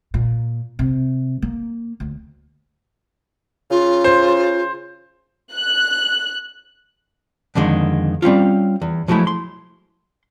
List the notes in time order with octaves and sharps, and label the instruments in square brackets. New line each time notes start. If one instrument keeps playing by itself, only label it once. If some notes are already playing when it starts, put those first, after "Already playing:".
[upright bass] A#2
C3
A#3
D2
[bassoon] C#3 [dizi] F4
[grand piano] C5
[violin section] F#6
[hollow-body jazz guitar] F2 D3 D#3 G#3
G3 C4 C#4 F4
E2
F3 F#3 G#3 A3 E4
C6